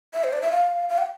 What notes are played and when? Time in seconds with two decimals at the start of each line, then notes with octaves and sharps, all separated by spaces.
0.14 E5
0.24 C5
0.33 D5
0.42 E5
0.51 F5
0.89 F5
0.98 G5